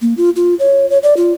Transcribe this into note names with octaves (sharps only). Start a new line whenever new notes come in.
A#3
F4
F4
C#5
C#5
D5
F4